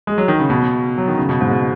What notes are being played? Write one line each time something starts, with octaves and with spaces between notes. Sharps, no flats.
G#3
F#3
D#3
C#3
B2
F#3
D#3
C#3
B2
G#2
B2